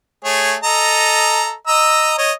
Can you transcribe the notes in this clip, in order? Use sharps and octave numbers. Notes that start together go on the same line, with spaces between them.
A3 G#4 C#5
A4 D#5 A#5
D#5 A#5 E6
C#5 D#5